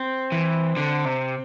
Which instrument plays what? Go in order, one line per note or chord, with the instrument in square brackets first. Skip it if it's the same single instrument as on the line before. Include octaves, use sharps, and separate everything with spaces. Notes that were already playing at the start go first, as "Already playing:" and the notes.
Already playing: [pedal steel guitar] C4
[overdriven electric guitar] E3
D3
C3